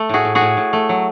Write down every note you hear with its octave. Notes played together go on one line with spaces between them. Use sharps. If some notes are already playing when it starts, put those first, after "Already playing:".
Already playing: A3
A2 F#4 G#4
A2
F#4 G#4
A2
A2
A3
F#3